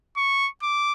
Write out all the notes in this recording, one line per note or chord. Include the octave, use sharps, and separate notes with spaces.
C#6
D6